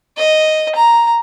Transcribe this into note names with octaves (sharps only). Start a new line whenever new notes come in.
D#5
A#5